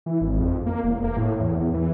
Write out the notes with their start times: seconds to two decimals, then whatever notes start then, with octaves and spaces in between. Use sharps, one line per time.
0.06 E3
0.21 G#1
0.40 F2
0.66 A#3
0.84 E1
1.04 A#3
1.17 A2
1.40 E2
1.60 E2
1.74 E3